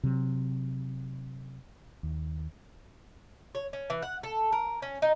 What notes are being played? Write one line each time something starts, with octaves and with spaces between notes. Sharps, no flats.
C3 F#3
D#2
C#5
C#4
E3
F#5
A4
A#4
C#4
D#4